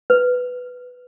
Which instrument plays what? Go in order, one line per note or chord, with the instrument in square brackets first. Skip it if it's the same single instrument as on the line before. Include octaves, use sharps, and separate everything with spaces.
[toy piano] B4